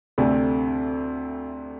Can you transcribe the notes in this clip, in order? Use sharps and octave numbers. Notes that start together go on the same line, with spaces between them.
D2 C3 A3 D4